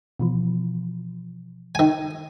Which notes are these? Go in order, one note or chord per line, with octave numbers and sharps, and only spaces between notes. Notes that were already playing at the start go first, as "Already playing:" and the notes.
B2 E3 F3
D#3 G#5 D#7